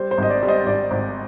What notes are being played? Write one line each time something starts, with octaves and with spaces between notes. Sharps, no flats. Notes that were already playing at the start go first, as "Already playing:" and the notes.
Already playing: G3 C5
C5
G#1 D#5
D5
G3
C5 D#5
G#1 D5
G#1